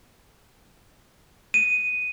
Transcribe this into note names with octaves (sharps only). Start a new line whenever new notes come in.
D#7